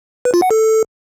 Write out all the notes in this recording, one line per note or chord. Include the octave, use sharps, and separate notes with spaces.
B4
F4
F#5
A4